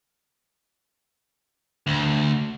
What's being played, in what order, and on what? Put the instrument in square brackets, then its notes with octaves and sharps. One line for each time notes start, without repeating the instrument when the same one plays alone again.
[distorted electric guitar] D2